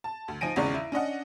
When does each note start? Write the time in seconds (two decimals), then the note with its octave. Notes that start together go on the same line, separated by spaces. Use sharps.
0.04 A5
0.28 D2
0.41 F3 D#4 G#5 A#6 D7 D#7
0.56 G#1 E2 C#3 G#3 D5 C#6
0.74 E4
0.92 C#4 D4 D#5 F#5